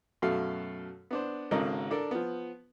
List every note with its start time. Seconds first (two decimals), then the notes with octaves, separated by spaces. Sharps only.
0.22 F#2 B2 A3 A4 F5
1.11 B3 D4 C5
1.51 G#1 G#2 C#3 A4 A#4 D#5
1.91 D4 A4 A#4
2.11 F3 B3